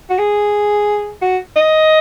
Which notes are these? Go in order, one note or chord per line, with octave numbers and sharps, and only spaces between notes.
F#4
G#4
F#4
D#5